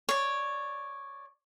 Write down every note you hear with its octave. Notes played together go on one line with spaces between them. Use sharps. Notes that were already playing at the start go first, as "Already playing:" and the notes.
C#5 D5